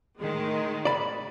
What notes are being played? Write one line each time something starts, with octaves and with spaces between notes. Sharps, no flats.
A2 D#3 G#3
D5 B5